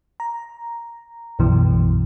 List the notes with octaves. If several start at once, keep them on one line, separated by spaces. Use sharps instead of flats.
A#5
B1 F#2 B2 E3